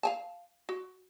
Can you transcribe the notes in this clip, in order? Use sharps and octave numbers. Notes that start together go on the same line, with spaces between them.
F5 G#5 A5
F#4